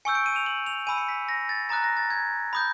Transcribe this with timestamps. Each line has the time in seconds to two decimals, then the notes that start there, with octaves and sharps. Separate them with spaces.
0.05 G#5 C#6 E6 G6 C#7
0.15 D7
0.26 D#7
0.36 F7
0.46 F#7
0.66 F7
0.87 G#5 B5 E6 D#7
0.98 C#7
1.09 B6
1.29 A#6
1.49 A6
1.69 A#5 D#6 F#6 A6
1.84 A#6
1.97 A6
2.10 G#6
2.53 B5 D#6 G6